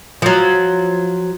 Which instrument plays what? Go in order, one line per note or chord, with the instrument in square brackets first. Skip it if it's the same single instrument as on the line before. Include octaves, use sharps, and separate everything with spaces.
[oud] F3 F#3